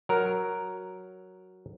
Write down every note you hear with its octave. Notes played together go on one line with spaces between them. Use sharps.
F#3 A#4